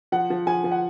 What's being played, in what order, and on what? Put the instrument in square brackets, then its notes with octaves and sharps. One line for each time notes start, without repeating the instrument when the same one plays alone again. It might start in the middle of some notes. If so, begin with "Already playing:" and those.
[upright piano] F3 F#5
F3
F3 G#5
F3
F#5